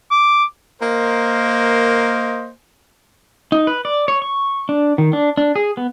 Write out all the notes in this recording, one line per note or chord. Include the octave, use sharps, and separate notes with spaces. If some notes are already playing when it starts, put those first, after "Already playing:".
D6
A#3 A#4 C5 D#5
D#4
B4
D5
C#5
C#6
D4
D#3
D4
D4
G#4
B3